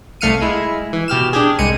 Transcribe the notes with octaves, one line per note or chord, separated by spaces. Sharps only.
C2 A3 F5 F6 C#7 D#7
G#3 E4
E3
B2 G4 F6 E7
D4 G4 G#4
C2 G#3 C#7 D#7